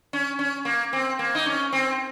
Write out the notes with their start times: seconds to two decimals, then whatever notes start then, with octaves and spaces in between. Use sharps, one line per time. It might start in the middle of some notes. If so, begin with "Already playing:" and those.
0.13 C#4
0.39 C#4
0.65 A#3
0.93 C4
1.19 A#3
1.35 D#4
1.46 C#4
1.73 C4